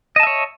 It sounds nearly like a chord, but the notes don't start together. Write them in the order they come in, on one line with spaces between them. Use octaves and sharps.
D#5 A5 E5 C#5